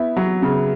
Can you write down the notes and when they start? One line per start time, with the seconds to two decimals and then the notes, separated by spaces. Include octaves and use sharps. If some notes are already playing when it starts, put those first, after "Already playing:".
Already playing: B3 E4
0.17 F#3
0.42 C#3